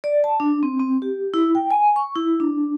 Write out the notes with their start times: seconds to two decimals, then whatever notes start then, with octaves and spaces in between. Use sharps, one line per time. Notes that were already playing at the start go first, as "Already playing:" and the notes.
0.04 D5
0.24 A5
0.40 D4
0.63 C4
0.79 C4
1.02 G4
1.34 E4
1.55 G5
1.71 G#5
1.96 C#6
2.16 E4
2.40 D4